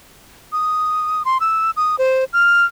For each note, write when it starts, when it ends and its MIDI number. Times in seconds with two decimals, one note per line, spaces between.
0.52 1.23 87
1.25 1.38 84
1.40 1.71 88
1.77 1.96 87
1.99 2.24 72
2.33 2.65 89